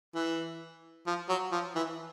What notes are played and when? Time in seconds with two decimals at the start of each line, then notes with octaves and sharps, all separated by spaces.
0.15 E3
1.07 F3
1.29 F#3
1.52 F3
1.75 E3